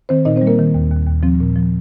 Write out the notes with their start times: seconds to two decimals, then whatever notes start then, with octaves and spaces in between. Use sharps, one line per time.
0.09 D#3 C4 C5
0.25 A#2 D#4 D#5
0.36 C4 C5
0.41 G3
0.47 A#3 A#4
0.59 D#3
0.74 D#2
0.91 D#2
1.07 D#2
1.23 F3 C4
1.40 A#2
1.56 F3